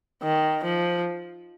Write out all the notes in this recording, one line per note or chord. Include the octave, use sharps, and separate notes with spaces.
D#3
F3